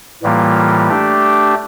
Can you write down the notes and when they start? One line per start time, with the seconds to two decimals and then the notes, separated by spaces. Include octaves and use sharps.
0.23 A2 E3 G3 A#3 F4
0.89 A3 D4 G4 D5